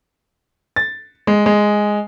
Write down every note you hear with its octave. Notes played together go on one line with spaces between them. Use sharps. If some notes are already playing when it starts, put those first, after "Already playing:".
A6
G#3
G#3